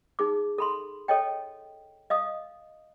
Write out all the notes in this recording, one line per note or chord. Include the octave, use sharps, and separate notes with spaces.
D#4 G#4 D6
A4 B5 C6
A4 C#5 D#5 G5
D#5 F5 D#6